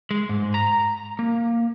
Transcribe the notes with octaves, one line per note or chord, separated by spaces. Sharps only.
G#3
G#2
A#5
A#3